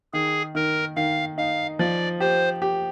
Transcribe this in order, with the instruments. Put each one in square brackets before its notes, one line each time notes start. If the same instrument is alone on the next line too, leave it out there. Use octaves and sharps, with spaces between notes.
[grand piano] D#3 [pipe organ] G#4
[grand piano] D#3 [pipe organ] A#4
[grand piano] D#3 [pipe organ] F5
[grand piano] D#4 [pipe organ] F5
[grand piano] F3 [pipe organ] D5
[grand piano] G4 [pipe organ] C5
[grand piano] G4